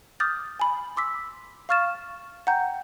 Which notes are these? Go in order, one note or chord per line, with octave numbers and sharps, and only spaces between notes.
D6 D#6 F6 G6 A6
G#5 B5
C6 D6 E6 B6
F5 C#6 F6 A6 E7
F#5 G5 A#5 G6